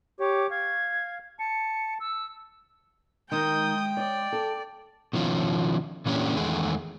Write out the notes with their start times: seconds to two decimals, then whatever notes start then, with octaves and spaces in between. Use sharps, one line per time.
0.20 G4 C#5 D6
0.51 F5 G#6
1.39 A5 C#7
2.00 E6
3.32 D#3 G#3 G5 D#6 G6
3.97 C#5 D5
4.32 A4
5.13 B2 D#3 F3 C#4
6.06 A#2 E3 A#3 C#4 D4 G4
6.36 E2 D#3 G#3 A3 G#4